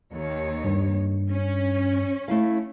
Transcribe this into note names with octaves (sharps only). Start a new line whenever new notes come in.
D#2 D#3 C#5
G2
C#4
A3 E4 F5